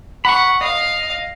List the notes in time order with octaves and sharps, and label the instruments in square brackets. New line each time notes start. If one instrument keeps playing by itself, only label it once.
[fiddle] F#5 [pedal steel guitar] B5 C#6
[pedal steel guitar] D#5 [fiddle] F5